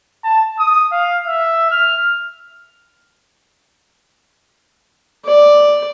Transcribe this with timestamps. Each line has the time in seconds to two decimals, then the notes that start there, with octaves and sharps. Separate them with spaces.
0.24 A5
0.59 D#6
0.92 F5
1.27 E5
1.71 F6
5.25 D5